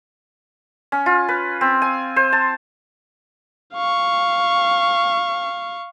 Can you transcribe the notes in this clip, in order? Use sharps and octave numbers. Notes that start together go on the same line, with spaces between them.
C#4
F4
B4
C4
G#5
C5
A5
F5 C#6